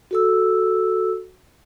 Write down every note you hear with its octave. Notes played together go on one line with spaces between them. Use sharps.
F#4 A4 E6